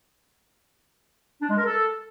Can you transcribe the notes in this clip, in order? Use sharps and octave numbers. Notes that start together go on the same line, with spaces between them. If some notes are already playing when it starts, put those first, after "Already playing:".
D4
G#3
A#4
A4